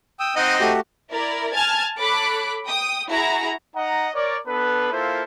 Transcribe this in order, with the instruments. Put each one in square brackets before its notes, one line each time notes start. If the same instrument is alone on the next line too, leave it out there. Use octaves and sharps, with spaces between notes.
[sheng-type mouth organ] G5 D#6 E6
[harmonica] C4 D#4 D#5 [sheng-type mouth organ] F#5
[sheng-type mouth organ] A3 F#4 G4
[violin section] E4 A#4 D5
G#5 A5 F6 G#6 A6
A4 C#5 B5 D6 F#6
G5 D#6
E4 F#4 G#4 A#5
[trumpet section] D#4 D#5 F#5 A#5
A#4 C#5 D5
B3 D4 A4 B4
A#3 E4 F4 A4 C5